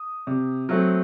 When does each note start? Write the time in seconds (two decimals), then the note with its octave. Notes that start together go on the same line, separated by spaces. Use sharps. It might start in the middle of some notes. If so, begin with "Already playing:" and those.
Already playing: D#6
0.27 C3
0.69 F#3 A3 C4